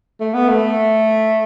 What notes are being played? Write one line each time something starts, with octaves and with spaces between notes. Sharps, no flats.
A3
B3
A3